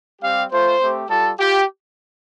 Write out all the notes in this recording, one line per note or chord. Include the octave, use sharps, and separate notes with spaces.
G3 C4 G4 F5
A3 F4 C5
A3 C4 G4
G3 F4 A4
F4 G4